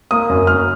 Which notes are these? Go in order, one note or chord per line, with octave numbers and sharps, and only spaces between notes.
A#3 D#6
F#2
F#2 F6